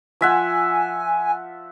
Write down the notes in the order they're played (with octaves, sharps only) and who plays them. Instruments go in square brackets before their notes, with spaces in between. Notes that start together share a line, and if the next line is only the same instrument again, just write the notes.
[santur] F3 E5 F#5 [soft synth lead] G#5